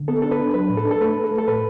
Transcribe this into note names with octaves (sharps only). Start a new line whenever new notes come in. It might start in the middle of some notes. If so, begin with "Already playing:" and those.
Already playing: D3
B3 A4
D4 A4
B4
D4
F#3 B4
A2
A4
D4
A4
A3 B4
A3
A4
A3
A4
A2 B4